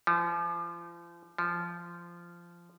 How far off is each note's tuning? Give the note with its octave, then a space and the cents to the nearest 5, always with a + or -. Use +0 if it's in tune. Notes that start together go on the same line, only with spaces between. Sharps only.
F3 -35
F3 -15